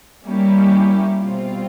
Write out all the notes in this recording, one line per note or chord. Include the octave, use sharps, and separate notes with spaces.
G3 A#3 C#4 E4 G4
B2 G3 C4 F4